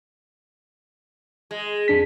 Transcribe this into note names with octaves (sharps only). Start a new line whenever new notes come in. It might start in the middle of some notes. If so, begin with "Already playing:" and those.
G#3
F2 D4 B6